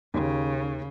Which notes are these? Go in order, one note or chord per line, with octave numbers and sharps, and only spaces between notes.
D#2 C#3